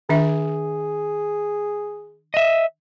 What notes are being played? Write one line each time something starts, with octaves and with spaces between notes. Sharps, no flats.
D#3 D4 G#4 E5
D#5 E5